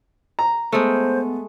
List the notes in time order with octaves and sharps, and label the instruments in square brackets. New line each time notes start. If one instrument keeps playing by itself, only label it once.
[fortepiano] A#5
[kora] G#3 A3 [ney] B3 [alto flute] C5